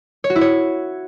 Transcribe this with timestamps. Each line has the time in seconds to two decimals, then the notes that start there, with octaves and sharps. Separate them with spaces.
0.24 C#5
0.30 F#4
0.36 E4
0.41 C#5